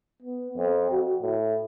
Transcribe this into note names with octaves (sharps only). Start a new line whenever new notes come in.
B3
F2
F#4
A2